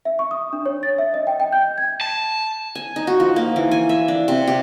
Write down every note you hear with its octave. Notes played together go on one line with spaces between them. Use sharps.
E5
C#6
D#6
D4
C#5
A6
E5
D#5
G5
G5
G6
G#6
A5
G#5
D#4
F#4
F3
A#3
E3
G#5
E5
D4
C3
G4